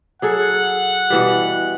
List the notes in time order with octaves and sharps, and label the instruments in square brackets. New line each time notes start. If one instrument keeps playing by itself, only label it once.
[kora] F#3 G#4 A4 [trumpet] F#5
[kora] B2 E3 G3